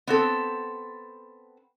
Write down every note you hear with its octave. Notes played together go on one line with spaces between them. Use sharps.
B3 C4 A4